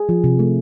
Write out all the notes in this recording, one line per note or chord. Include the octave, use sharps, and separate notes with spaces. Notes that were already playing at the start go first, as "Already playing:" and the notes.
Already playing: G#4
F3
C3
A3